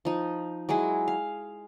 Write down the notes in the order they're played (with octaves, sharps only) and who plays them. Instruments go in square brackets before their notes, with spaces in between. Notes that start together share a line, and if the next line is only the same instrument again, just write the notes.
[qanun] F3 D#4
F#3 G#3 E4 G#4
F5